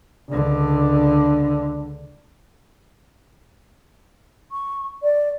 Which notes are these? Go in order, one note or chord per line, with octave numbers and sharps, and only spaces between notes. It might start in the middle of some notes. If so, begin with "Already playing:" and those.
C#2 D3 D4
C#6
D5